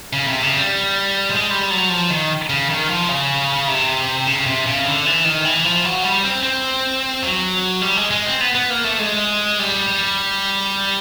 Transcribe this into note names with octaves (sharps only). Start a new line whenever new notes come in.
C#3
C3
C#3
G3
G#3
G3
F#3
F3
D#3
C#3
D#3
F3
C#3
C3
C#3
C3
C#3
D3
E3
D#3
E3
F3
F#3
G3
C4
C4
F#3
G3
G#3
G#3
C4
B3
B3
A#3
A3
G#3
G3